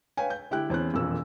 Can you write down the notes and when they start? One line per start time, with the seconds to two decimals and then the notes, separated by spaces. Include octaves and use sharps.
0.17 B4 C#5 F5 G5 G#5
0.30 G6
0.51 D3 E4 G4 G5 F#6
0.70 E2 C4 C#4 F#6
0.94 E1 F2 A#2 E6